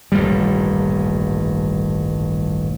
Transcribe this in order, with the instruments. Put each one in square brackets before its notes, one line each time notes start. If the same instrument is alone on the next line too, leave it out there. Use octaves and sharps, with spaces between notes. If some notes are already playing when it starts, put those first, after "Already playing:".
[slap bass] D#1 A1 G2 G3